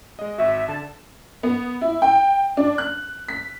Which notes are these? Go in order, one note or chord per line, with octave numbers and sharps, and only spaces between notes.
G#3 D#5
G#1 F#4 E5
D3 A5
B3
E4
G5
D4
F#6
B6